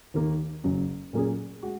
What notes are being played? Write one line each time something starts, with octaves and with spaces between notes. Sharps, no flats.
D#2 D#3 A#3
F#1 F#2 F#3
A#2 F#3 A#3 C#4 G#4
G#3 F#4